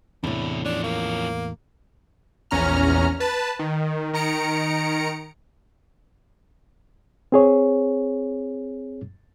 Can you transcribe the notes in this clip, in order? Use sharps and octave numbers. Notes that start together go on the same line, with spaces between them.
E2 A2 C3 D4 E4
F3 C#4 D4
A#3
A#1 E2 C#4 A#5 F6
B4 A5
D#3
D#3 A#5 C#7 D7
C4 G#4 C#5